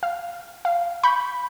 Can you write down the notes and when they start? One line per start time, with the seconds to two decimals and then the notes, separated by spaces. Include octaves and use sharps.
0.03 F5
0.65 F5
1.03 B5 C#6 G6